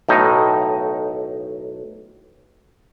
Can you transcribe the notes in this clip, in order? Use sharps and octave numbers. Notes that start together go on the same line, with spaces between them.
B1 A2 D#4